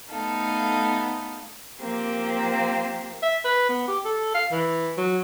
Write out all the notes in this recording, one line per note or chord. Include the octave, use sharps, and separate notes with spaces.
A3 B3 D#4 A4 F5
F3 A#3 C4 G4
E5
B4
B3
G4
A4
F5
E3
F#3